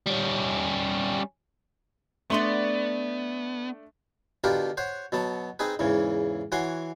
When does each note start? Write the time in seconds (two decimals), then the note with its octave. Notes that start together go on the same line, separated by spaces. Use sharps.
0.06 G3 C#4
2.30 A3 B3 D4 D5 C6 C#6
4.44 B2 D3 F4 G4 A#4 B4
4.77 C5 C#5 F#5
5.12 B2 F#3 B3 A5
5.59 C4 D#4 G#4 B4
5.79 E2 G#2 C#3 E3
6.52 E3 F#4 C#5 F#5 G#5 C6